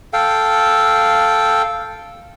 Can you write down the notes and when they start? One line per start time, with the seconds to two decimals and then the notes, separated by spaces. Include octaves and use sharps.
0.13 A4 F5 G5